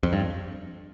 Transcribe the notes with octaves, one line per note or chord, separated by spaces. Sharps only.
F2
G2